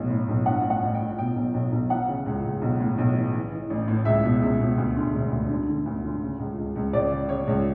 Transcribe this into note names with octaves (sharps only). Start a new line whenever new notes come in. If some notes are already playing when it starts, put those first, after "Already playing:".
Already playing: B1 A2
A2
B1
G2 F#5
A1
F#5
A1
G5
A1
B2 G5
B1
B1
B1
E3 F#5
C#3
C#2
C#2
B1
A2
B1
E3
E3
E3
A1
A2
C#2 E5
B2
C#2
B2
D2
D3
E1
D2
D3
D3
D2
D3
C#3
C#2
C#2
C#2
C#2 D5
C#3
C#3 C#5
C#2